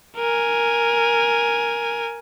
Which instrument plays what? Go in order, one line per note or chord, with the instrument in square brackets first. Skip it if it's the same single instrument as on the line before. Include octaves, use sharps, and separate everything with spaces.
[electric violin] A#4 G#5